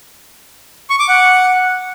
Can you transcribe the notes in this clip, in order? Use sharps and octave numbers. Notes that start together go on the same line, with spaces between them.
C#6
D6
F#5